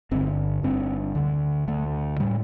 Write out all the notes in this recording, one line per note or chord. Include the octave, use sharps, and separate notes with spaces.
G1 G2 D3 C4
G1 G2 D3 C4
D2 D3
D2 D3 A3
A2 G3